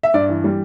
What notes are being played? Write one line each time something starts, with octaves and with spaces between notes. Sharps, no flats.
E5
G2 D5
E3
G3